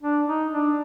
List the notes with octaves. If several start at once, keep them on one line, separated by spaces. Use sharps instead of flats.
D4
D#4
D4